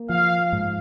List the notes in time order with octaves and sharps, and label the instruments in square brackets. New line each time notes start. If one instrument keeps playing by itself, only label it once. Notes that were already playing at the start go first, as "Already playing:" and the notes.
Already playing: [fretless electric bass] A#3
[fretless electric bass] F3 [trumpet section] F5
[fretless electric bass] G#2